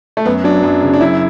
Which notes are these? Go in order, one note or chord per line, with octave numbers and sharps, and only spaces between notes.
A3
F#2 B3
F#3 D4
F#2
C#3
D4
F#2 E4